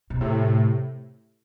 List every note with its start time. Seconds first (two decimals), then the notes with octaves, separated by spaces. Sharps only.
0.10 B2
0.20 A2 C3